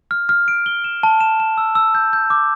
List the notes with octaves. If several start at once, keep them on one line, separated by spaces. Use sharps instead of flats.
F6
F6
D7
G7
E7
A5
E7
E7
E6
E6
G6
G6
D6